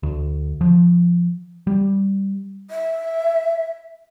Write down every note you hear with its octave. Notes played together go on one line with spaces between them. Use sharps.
D2
F3
G3
E5